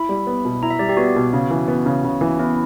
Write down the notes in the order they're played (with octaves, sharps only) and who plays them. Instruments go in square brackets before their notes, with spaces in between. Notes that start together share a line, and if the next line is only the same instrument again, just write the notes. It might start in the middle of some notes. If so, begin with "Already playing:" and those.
Already playing: [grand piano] E4 [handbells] B5
[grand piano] G3
B3
B2
[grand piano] E4 [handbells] A#5
[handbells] E5
[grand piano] G3 [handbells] D5
[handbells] G4
[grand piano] B3 [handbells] F#4
[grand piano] B2
C#3
E3
B3
C#3
C#3
E3
[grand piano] B3 [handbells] E4